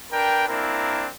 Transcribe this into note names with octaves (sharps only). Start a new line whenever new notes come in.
D4 A#4 B4 G5
A#3 C4 D4 E4 A#4